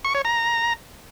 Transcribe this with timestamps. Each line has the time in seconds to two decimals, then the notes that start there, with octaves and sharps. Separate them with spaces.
0.05 C#6
0.15 C#5
0.25 A#5